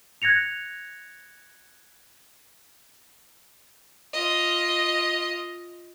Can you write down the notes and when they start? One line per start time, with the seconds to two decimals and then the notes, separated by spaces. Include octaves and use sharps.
0.22 F#6 G#6 A#6 C#7 F7
4.13 F4 D#5